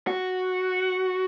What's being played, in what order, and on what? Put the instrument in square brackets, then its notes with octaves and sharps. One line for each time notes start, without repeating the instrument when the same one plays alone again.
[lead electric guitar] F#4